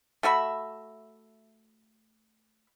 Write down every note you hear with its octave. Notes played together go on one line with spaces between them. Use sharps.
A3 F#4 E5 B5